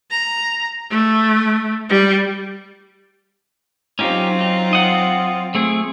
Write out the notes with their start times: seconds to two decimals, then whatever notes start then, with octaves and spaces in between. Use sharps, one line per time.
0.11 A#5
0.90 A3
1.89 G3
3.99 F#3 C4 C#4 D#4 F4 G4
4.41 D#4
4.73 D#5 F#5
5.55 A3 C4 G#4